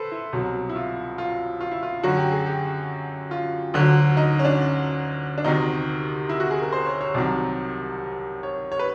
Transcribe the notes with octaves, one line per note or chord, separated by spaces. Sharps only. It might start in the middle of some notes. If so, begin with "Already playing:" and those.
Already playing: A4 B4 C5
E4
C2 B2 F#3
E4
F4
F4
F4
E4
F4
F#2 D3 F#3 F#4
G4
G#4
G4
F4
D2 D3 F#3
D#4
C#4
D4
D4
D2 C3 D#3 D#4
E4
F#4
G#4
A#4
C5
C#5
C#5
C2 C3 D#3 F#3 D5
C#5
C#5
B4